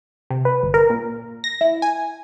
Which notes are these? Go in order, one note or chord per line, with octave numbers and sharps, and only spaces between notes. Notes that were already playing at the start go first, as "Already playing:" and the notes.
C3
B4
G1
A#4
A#2
A#6
E4
G#5